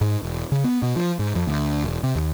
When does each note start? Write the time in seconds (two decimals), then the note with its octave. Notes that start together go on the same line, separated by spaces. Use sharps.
0.01 G#2
0.23 E1
0.52 C#3
0.64 B3
0.82 B2
0.96 F3
1.19 G#2
1.35 F2
1.47 D2
1.84 E1
2.03 C3
2.15 D#2